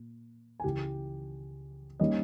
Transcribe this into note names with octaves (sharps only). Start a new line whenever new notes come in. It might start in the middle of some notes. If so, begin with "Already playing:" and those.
Already playing: A#2
G#5
C#2 C#3 E3 G4 G5
D#3 G3 A#3 C#4 D#5